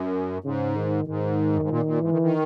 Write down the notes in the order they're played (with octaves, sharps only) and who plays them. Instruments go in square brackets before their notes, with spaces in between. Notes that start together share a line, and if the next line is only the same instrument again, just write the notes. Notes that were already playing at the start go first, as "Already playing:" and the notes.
Already playing: [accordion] F#2
[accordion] G#2 [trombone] C#3
[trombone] D#3
[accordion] G#2 [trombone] D#3
[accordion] F#2
G#2
A#2
A#2
[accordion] G#2 [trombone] E3
[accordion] D#3
D#3